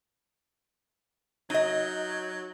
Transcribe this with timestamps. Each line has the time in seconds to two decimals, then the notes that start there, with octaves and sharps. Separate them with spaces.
1.50 F#3 D#4 D#5